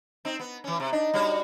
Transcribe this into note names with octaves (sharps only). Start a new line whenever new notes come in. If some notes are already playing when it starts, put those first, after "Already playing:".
C4 D#4
B3
E3 C#4
C3
D4 D#4
G3 F#4 C#5